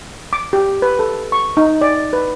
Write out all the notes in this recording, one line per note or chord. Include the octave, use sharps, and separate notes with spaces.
D6
G4
B4
A4
C#6
D#4
D5
B4